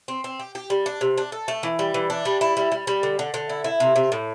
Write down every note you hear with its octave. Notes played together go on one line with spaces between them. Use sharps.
C4
C4
G4
G4
G3
D4
C3
D4
A4
A3
E3
G3
E3
D4
G3
E4
G3
G3
G3
D3
D3
D3
E4
E4
C3
C3
A2